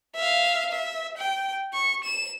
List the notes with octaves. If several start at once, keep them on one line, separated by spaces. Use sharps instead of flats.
E5 F5
E5
G5
C#6
E7